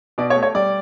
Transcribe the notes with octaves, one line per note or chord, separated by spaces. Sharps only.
B2 D5
C#5
A3
C#5
G3 D5